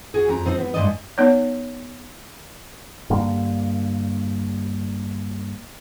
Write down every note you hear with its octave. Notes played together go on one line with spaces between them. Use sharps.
F#4 G#4
F2 A#5
F3 C4 D#4 C5
B3
G2 G#3 A3 D5 D#5
B3 D#4 C#5
G2 D3 A#3